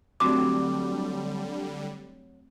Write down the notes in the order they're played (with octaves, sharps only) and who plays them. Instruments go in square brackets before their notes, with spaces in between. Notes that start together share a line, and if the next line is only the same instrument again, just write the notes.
[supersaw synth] D3 G3 [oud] F#3 G4 [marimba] A3 C4 F#4 [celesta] D6